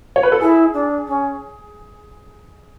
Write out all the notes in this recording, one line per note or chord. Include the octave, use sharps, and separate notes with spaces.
C#5
B4
A4
E4 G#4
D4
C#4